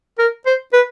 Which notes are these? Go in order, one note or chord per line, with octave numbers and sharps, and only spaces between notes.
A#4
C5
B4